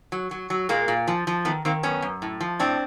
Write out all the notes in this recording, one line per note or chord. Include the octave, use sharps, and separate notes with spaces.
F#3
F#3
F#3
A#2 G#3 A#3
A#2
F3
F3
D#3 A3 B3
D#3 A#3 C4
F#2 B3 C#4
F#2
A2
F3
A2 C4 D4